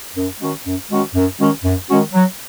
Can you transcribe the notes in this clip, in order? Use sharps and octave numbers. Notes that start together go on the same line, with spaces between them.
F#2
D#3 G#3 C#4 F#4
F#2
D#3 G#3 C#4 F#4
F#2
D#3 G#3 C#4 F#4
F#2
D#3 G#3 C#4 F#4
F#3